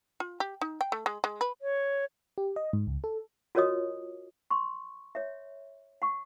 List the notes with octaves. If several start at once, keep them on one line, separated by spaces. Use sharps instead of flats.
F4
G4
D#4
G5
A3
G#3
G#3
B4
C#5
G4
D#5
G#2
C#2
A4
F4 F#4 A#4 C#5 D#5 D#6
C6 C#6
C#5 E5
F#5 C#6